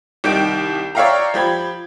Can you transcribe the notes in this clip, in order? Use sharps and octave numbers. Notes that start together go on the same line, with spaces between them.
C2 D#3 G4 G6 D7
C#5 D5 E5 F5 G5 A#5
F3 G4 B5 G#6